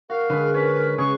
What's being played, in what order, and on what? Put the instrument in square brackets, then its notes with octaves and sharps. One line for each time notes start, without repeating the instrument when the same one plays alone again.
[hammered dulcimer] F#4 [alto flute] A#4 [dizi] F5
[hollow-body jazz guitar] D3 [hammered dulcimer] G#3 B4
[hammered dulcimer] C#4 [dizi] B4
[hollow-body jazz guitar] C#3 [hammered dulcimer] G#4 [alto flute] B4 [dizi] C#6